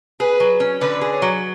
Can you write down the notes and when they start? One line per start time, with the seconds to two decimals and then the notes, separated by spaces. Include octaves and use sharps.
0.20 G#4 B4
0.40 F#3
0.60 C#4
0.81 D3 B4
1.01 G#4
1.12 C#5
1.22 F#3